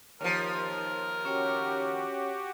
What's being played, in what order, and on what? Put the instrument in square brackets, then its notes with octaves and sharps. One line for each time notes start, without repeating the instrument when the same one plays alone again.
[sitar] D#2 F3 [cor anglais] A#4
[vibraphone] C#4 C#5 G5 [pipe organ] F#4 G4